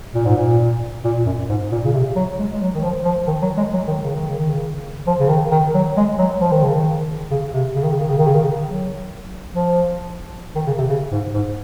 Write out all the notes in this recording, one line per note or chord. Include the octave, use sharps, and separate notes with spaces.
A#2
G#2
A#2
A#2
F#2
G#2
A#2
C#3
C3
F#3
G#3
G#3
F#3
D#3
F3
F3
D#3
F#3
G#3
F#3
D#3
C#3
D#3
C#3
D#3
C#3
F3
C#3
D#3
D#3
F#3
G#3
F#3
F3
D#3
C#3
D#3
C#3
C3
C#3
D#3
C#3
D#3
C#3
D#3
C#3
D#3
C#3
F#3
F3
D#3
C#3
C3
C#3
G#2
G#2